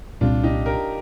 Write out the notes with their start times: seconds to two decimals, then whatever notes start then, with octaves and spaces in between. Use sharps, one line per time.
0.21 C2 A#2 G3 C4 D4 F4
0.43 D#4 G4
0.66 G4 A#4